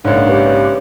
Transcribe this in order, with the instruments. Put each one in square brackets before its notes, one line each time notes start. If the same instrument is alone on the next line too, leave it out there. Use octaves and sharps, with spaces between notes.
[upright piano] A#1 G#2 [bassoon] C#3 [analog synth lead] D4
[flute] G4 [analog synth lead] B4